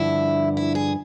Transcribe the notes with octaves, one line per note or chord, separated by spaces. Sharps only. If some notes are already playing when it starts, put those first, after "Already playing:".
Already playing: G2 D3 F3 E4
E4
G#4